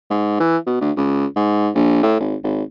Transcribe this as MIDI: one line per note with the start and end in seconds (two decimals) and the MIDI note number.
0.11 0.38 44
0.40 0.57 52
0.67 0.79 47
0.81 0.92 38
0.97 1.26 37
1.36 1.70 44
1.75 2.00 34
2.03 2.16 45
2.20 2.36 32
2.44 2.63 32